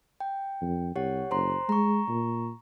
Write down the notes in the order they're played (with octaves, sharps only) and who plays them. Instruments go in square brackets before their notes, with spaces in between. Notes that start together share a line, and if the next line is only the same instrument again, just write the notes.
[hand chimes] G5
[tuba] F2
[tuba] C2 [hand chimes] G4 C#5 F#5
[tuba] F#1 [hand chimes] C5 A#5 C6
[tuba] G#3 [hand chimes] A#5 C#6
[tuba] A#2